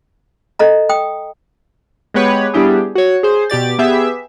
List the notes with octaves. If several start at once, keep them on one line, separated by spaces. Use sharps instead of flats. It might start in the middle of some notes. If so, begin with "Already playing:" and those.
A4 D#5 A#5
G5 D#6
G#3 B3 G4 B4 C#5
G3 B3 D4 E4 G4 G#4
F#4 C#5
G#4 C5
B2 G4 D5 A6
B3 G4 G#4 E5